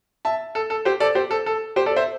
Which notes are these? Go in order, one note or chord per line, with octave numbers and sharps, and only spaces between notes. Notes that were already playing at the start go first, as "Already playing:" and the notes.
E5 A5
A4
A4
G4 C5
A4 D5
G4 C5
A4
A4
G4 C5
A4 D5
C5 E5